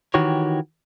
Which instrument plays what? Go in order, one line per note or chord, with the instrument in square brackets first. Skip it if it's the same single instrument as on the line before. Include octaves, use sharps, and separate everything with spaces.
[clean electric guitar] D#3 E3 F#4 G4 C#5